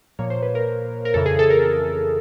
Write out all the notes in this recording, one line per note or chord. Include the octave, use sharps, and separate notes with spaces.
A#2 F3 A#3 C#5
C5
B4
A#4
A#4
F2 C#3 E3 A4
G#4
A4
A#4